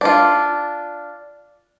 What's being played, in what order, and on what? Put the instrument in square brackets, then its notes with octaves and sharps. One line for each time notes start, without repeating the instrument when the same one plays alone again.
[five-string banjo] D4 F4